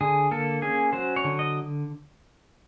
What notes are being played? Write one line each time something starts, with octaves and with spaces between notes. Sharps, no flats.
D3 G#4
A#3 A4
C#4 G#4
F#3 C5
C#5
D3
D#5